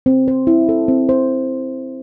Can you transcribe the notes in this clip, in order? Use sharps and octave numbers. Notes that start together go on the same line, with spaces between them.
C4
C5
E4
A4
C4
C5